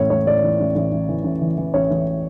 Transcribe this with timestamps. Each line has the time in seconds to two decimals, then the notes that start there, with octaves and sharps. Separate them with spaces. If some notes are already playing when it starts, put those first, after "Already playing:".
Already playing: A1 A2 C#5
0.10 A1 C#5
0.27 A2 D5
0.43 E3
0.60 A1
0.76 A1
0.92 A1
1.09 E3
1.24 A1
1.41 E3
1.58 E3
1.74 A1 C#5
1.91 A1